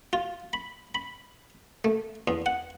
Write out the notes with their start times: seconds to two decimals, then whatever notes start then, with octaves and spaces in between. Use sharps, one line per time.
0.13 F4
0.53 B5
0.95 B5
1.85 A3
2.28 E2
2.46 F#5